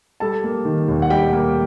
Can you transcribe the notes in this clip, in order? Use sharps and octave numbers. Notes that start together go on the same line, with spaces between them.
G3 A4 A5
A#3
D#3
D#2
F#5
G3 G4 G5
A#3